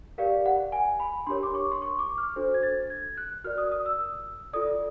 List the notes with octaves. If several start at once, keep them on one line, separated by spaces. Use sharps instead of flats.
G4 A#4 D5 F5
F#5
G#5
B5
D4 G4 A#4 C#5 C6
D6
C#6
C6
C#6
D6
F6
D4 F#4 A4 C5
G#6
A6
G#6
F#6
F#4 A#4 D5 F6
D#6
D#6
E6
F4 A4 D5 D#6